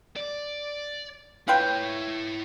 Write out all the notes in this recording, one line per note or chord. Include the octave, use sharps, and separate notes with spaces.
D5
E4 F4 B4 C#5 G5